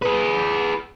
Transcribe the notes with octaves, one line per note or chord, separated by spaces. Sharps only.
G#4 B4